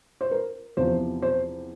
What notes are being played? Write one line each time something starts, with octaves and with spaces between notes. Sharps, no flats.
C5
A#4
E2 C3 F3 C5
C5